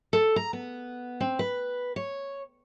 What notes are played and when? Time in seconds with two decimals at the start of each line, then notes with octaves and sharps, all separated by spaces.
0.13 A4
0.36 A#5
0.53 B3
1.20 C4
1.39 B4
1.96 C#5